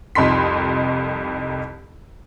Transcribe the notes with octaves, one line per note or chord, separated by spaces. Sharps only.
C2 F2 D#4 B5 C6 B6